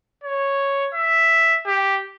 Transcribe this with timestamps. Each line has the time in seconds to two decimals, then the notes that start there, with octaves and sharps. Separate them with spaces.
0.23 C#5
0.94 E5
1.66 G4